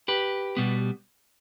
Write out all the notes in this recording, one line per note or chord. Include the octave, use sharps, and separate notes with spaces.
G4 B4
B2 G3 B3